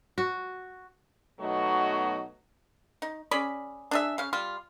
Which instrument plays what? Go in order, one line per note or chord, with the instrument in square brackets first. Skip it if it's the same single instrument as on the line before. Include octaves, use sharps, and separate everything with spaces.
[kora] F#4
[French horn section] B2 F#3 A3 B3 D#4 F#4
[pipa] D#4
C#4 G#4 D5 B5
D4 G#4 E5
C#3 F5
G3 F4